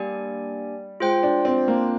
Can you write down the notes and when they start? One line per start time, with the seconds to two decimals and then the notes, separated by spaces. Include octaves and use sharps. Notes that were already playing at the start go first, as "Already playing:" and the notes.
Already playing: G3 A#3 D4 G4 D5 G#5
1.00 G#3 F4 C5 G5
1.23 D4
1.45 C4
1.68 A#3